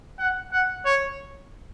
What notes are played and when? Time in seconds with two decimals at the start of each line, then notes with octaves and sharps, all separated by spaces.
0.18 F#5
0.52 F#5
0.86 C#5